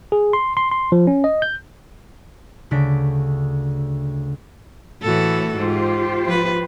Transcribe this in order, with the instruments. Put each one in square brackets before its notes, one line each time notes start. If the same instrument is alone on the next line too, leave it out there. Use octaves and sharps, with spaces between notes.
[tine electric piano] G#4
C6
C6
C6
F3
C#4
D#5
G6
[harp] D2 C#3 D4 B6 D7
[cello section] A2 [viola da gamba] E3 F#4 A4
[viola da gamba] G#2 [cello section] F4 G4 C5
[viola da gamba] F3 B4